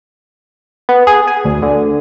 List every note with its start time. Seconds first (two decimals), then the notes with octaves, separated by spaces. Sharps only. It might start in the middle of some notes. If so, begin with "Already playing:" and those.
0.89 B3
1.07 G#4
1.27 G#5
1.45 D2
1.62 D3